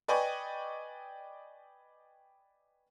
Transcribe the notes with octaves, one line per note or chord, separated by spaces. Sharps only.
B4 D5 D#5 G5 G#5 C#6